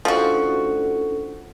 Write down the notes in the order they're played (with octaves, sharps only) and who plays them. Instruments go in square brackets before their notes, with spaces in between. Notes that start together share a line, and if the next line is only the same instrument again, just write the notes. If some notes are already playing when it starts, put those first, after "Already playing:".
[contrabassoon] D2 [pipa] F3 F#4 [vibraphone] C#4 E4 A4